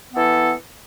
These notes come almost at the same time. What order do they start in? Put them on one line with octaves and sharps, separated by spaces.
B3 E3 A4